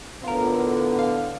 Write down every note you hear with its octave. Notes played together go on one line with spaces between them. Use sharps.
A2 D3 B3 F4 A#4
F5